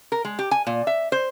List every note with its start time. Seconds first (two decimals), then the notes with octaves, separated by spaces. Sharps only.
0.12 A#4
0.25 G#3
0.39 G4
0.51 G#5
0.67 A#2
0.87 E5
1.12 C5